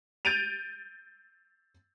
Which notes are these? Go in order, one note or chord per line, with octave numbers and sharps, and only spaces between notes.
G6 A6 D7 D#7 F7